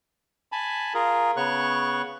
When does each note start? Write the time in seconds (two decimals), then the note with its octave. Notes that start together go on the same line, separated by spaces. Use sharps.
0.52 G#5 A5 B5
0.94 F4 G#4 A#4
1.37 C#3 B3 C#5 C#6 F#6